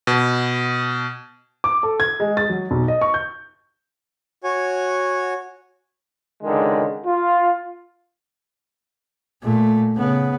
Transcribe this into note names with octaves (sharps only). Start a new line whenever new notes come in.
B2
D6
A4
G#6
G#3
A6
F#3
B1
D#5
C#6
G6
F#4 C#5 G#5
C#2 D3 D#3 G#3
F4
A#2 A3
C#3 B3